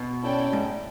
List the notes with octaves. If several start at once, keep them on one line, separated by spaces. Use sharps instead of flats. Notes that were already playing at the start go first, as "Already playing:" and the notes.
Already playing: B2
C#4 E4 A4 D5 G5
G#2